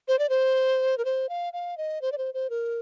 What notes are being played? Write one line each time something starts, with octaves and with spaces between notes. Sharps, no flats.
C5
D5
C5
A#4
C5
F5
F5
D#5
C5
D5
C5
C5
A#4